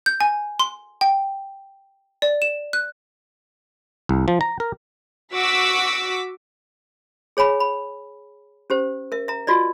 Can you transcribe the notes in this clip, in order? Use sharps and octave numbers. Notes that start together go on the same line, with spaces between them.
G6
G#5
C6
G5
D5
E7
F#6
C2
F3
A#5
A#4
F#4 D6 E6 B6
G#4 C#5 G#5 B5
B5
C#4 G4 C5
A#4 E5
E5 A#5
F4 F#4 D5 D#5